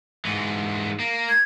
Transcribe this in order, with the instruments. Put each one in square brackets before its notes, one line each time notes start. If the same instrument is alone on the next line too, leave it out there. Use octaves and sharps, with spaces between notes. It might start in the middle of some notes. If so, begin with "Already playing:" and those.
[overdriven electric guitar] G#2 E3
A#3
[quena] G#6